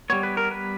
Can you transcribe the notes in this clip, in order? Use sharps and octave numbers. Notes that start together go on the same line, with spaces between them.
G3 B3 C#5
B4
A#4
B4